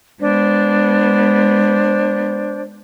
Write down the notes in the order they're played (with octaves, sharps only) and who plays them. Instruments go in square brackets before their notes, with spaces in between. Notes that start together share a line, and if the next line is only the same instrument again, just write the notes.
[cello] G#3 B3 [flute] D4 [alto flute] C5